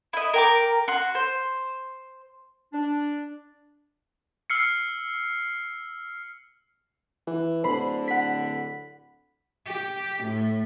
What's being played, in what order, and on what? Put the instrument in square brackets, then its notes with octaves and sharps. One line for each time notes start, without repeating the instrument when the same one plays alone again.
[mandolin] E4 D#5
A#4 G5 D6
F#4 C6
C5
[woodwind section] D4
[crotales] E6 F6 C7 C#7
[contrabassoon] E3
[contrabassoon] D1 [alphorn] D3 [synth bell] C5 [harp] B5
[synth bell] F#5 B6
[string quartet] G4
A2